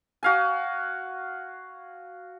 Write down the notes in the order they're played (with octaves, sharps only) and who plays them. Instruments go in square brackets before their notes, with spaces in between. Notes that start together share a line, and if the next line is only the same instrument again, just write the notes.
[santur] F#4 F5 G#5